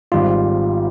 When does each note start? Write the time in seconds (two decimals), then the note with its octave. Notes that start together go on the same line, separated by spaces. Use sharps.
0.12 G#1 G#2 G3 F4